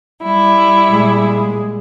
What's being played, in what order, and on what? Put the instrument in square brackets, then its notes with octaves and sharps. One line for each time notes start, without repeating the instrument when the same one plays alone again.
[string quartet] G3 E4
[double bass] A#2 G#3